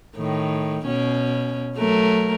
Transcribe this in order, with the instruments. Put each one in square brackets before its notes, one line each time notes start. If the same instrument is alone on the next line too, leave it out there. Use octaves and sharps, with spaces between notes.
[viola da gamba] A2 D#3
B2 C#4
F#3 A3 A#4